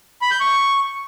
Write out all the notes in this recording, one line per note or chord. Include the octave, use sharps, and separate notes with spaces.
B5
G6
C#6